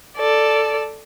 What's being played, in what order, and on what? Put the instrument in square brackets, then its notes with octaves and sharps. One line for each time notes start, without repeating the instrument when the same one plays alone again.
[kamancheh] A4 D5